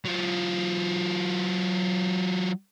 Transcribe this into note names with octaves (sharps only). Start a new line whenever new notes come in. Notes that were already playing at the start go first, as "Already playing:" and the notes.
F#3 F4